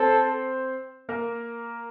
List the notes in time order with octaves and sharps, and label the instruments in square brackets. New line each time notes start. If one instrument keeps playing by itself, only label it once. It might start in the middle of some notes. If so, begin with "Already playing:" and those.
Already playing: [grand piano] C4 C5 [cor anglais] A4
[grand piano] A#3 A#4